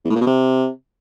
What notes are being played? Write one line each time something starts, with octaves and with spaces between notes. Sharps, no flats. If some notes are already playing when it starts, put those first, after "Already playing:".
E2
A2
A#2
B2
C3